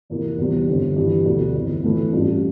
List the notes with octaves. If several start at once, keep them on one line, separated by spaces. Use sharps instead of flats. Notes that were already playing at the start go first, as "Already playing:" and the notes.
F2 C3 E3 A#3 E4
E2 C3 E3 G3 C4
G1 G2 D3 F3 C4
G1 G2 E3 G3
E1 D2 D3
G1 F2 E3
A2 E3 A3 E4
A1 G2 F3